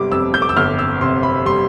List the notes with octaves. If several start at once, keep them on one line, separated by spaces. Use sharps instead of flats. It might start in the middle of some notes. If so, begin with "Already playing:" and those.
Already playing: G1 C3 G3 D6
F2 E6
G6
D6
E6
G1 F6
E6
C3 C6
B5
G3 C6